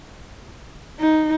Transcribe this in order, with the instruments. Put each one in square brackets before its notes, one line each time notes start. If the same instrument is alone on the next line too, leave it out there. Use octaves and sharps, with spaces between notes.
[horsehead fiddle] D#4